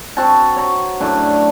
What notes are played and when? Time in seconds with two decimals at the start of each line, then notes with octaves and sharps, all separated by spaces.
0.17 C4 F#4 F#5 A5
0.56 C#5 A#5
1.00 F#2 A2 D4 D5